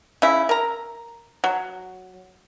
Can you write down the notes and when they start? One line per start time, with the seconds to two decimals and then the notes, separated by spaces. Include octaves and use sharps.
0.22 C#3 E4
0.49 A#4 A#5
1.44 F#3